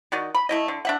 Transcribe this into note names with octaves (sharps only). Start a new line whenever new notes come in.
D#3 F#4 D5 D#5
B5
A3 E4 D#5
D3
D4 E5 F#5